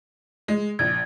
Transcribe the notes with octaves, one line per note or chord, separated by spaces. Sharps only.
G#3
A#1 G#6